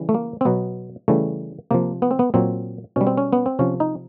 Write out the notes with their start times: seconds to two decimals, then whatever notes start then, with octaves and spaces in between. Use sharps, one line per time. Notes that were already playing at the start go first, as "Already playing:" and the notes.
Already playing: C#3 E3 G3
0.09 A3
0.14 A#3
0.41 C4
0.45 B2 F#3 B3
1.08 C#3 E3 G3 A3
1.71 C3 F3 A#3
2.02 B3
2.11 C4
2.19 B3
2.34 A#2 F#3 C4
2.96 B2 G3 C#4
3.07 C4
3.18 C#4
3.33 B3
3.46 C4
3.59 C3 F3 C#4
3.80 D#4